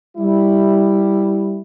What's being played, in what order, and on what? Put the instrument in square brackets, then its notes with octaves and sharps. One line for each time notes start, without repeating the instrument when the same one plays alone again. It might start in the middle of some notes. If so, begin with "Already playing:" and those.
[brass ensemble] G3 E4